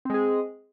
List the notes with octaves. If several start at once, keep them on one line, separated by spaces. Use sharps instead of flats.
G#3 C4 G#4